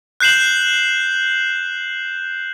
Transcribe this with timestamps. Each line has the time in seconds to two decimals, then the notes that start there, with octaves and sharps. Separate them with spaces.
0.20 F#6 G6 C7 E7 F#7